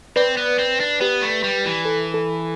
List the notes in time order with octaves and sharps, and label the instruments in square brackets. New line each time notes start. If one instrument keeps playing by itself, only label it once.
[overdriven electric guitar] C4 [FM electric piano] B4 D5
[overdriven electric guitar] B3
C4
D4
[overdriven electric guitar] B3 [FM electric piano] G4 B4
[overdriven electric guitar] A3
G3
E3
[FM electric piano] A4
A4